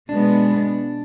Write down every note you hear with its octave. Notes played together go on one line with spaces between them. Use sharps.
B2 G#3 B3 D4